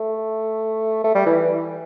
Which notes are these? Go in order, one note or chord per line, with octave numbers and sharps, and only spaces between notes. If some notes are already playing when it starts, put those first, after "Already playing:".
Already playing: A3
A3
G3
E3